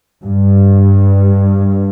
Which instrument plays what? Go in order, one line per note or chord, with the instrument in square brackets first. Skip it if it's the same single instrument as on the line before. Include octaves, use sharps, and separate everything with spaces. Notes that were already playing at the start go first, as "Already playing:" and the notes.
[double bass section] G2